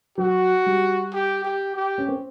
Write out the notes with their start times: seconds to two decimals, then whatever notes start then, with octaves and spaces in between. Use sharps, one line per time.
0.18 F#3 F#4
0.66 G3
1.13 G4
1.44 G4
1.76 G4
1.98 C#4
2.08 C4